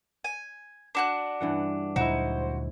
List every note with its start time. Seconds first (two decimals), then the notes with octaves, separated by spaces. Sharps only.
0.24 G#5
0.95 D4 F#4 F#6
1.41 G2 E3 F#5
1.96 D2 A#2 F#3 D#4 E4 F#4 C5